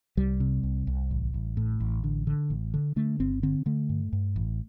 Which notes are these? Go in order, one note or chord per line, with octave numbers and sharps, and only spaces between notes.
C2 G3
C3
C2
C2
A1
A1
A2
A1
D3
D3
A1
D3
D3 A3
G1 C4
D3 C4
D3 A3
G2
G2
A1